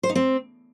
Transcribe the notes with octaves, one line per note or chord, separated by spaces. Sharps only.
C5
D#4
C4